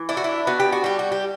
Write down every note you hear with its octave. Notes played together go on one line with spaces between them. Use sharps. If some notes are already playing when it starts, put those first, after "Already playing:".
Already playing: E3
D4 E4
F#4
E4
B3 F#4
G4
F#4
G3 G4
F#4
G4